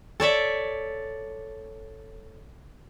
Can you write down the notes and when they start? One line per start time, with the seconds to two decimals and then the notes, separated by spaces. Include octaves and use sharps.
0.20 A4 C#5 D5 E5